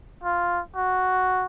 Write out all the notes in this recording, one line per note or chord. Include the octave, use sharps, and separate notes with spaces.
F4
F#4